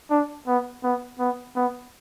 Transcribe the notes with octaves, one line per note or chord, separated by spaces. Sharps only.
D4
B3
B3
B3
B3